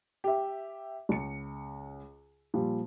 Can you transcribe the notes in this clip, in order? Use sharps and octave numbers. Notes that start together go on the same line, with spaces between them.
G4 E5
C#2 C#7
A#2 F3 G3